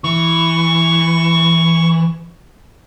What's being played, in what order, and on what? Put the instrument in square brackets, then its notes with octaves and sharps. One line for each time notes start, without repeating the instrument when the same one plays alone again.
[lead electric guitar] E3 [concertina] C#6